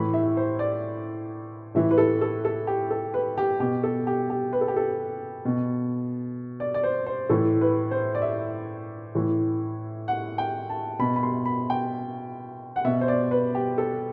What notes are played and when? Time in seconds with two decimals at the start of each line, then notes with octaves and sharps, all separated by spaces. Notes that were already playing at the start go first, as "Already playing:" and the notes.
Already playing: A2 E3 B5
0.14 E5
0.37 C5
0.59 D5
1.75 A2 E3 E5
1.91 B4
1.98 A4
2.21 A4
2.45 A4
2.67 G4
2.90 A4
3.14 B4
3.38 G4
3.60 B2 G4
3.83 A4
4.07 G4
4.30 G4
4.53 B4
4.61 A4
4.68 G4
4.76 A4
5.45 B2
6.60 D5
6.74 D5
6.83 C5
7.06 C5
7.29 A2 E3 A4
7.61 B4
7.91 C5
8.15 D5
8.22 E5
9.15 A2 E3
10.08 F#5
10.38 G5
10.70 A5
10.99 B2 B5
11.16 B5
11.23 C6
11.46 B5
11.70 G5
12.76 F#5
12.85 B2 E5
13.01 C5
13.08 D5
13.31 B4
13.55 G4
13.78 A4